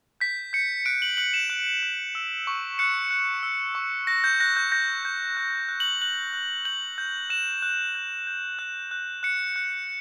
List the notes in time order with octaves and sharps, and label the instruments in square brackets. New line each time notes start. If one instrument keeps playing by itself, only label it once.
[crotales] G6 B6
G6 C#7
F#6 D7
F#7
F#6 F#7
E7
F#6
F#6
E6
C#6
F#6 C#7
F#6
E6
C#6
F#6 A#6
G6
F#6 A#6
G6
G6 A#6
G6
F#6
F#6
F#7
F#6 F#7
F#6
G6 F#7
G6
F#6 E7
F#6
G6
G6
F#6
F#6
F#6 C#7
F#6